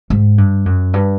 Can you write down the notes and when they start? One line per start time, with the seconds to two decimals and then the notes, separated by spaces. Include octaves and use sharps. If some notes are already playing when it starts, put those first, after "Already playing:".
0.10 G#2
0.38 G2
0.66 F#2
0.93 G2